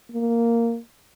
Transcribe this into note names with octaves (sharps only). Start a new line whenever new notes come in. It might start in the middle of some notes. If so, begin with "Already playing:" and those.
A#3